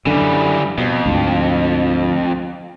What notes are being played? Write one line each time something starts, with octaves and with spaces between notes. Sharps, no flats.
F#2 D3 E3 G3
F2 B2
D2 G#2